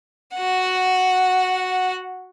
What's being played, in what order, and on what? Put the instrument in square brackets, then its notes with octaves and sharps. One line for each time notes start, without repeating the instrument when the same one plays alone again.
[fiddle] F#4 F#5